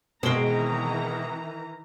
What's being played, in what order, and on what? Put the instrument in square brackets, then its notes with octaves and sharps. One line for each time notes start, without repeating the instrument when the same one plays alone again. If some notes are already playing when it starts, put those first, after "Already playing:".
[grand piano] B2 G7 [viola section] D#3 E3 A#5 [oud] G#3 C4